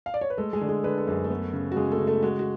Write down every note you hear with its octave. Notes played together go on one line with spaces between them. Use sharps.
F5
D5
C#5
B4
G#3 A3 A4
G#3 G#4
D3
G#3 G#4
D3 B4
A4
F#2 G#4
A3 A4
B3
C#3
F#4
C#3 G#3 G#4
A3 A4
C#3
A3 A4
G#3 F#4
F#4